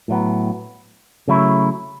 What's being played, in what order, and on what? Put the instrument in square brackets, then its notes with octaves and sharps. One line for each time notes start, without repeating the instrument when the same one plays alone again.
[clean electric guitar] A2 F#3 B3
C#3 F#3 A3 E4